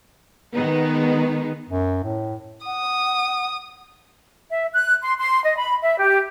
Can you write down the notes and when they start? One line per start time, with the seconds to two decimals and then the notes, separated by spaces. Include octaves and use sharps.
0.55 D#3 G#3 B3 D#4
1.69 F#2
2.04 A2
2.66 F#5 D#6
4.49 E5
4.73 F#6
5.03 C6
5.18 C6
5.43 D#5
5.57 B5
5.82 E5
5.99 G4